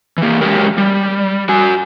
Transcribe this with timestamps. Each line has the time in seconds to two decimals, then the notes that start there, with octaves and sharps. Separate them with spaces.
0.18 E3 A#3
0.41 F#3 G#3 C#4 G4 A#4
0.78 G3
1.49 F#4 G#5